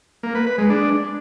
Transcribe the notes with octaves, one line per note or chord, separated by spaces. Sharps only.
A#3
B4
B4
G#3
D4